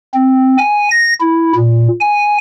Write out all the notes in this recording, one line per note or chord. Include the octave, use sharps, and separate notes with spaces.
C4
G#5
A#6
E4
A#2
G#5